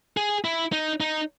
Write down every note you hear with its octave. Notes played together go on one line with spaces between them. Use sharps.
G#4
E4
D#4
D#4